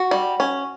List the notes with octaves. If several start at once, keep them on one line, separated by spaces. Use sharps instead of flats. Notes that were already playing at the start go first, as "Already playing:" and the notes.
Already playing: F#4
G3
C#4